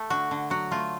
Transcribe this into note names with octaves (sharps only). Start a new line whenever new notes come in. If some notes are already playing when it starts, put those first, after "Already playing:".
Already playing: A3 A4
D3 F#4
D3
F#3 F#4
A3 F4